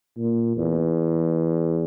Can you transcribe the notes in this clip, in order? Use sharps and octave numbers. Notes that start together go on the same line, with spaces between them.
A#2
E2